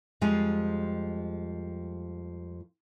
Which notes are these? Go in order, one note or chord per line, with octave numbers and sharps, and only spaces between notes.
F2 F3 G3 G#3 G#5